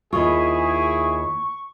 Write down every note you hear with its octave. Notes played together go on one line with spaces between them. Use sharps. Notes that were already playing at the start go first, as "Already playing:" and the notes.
D#2 E4 F4 G#4 C#6